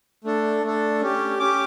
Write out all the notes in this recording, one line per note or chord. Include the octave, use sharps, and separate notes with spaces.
A3 D4 A4
A3 D4 A4
C#4 G4
C#4 G4 D6